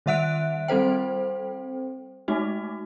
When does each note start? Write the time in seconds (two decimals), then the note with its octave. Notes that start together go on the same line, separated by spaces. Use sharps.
0.06 D#3 G3 E5 F#5 F#6 D7
0.68 G3 C4 A4 C5 G5
2.28 G#3 A3 D#4 F#4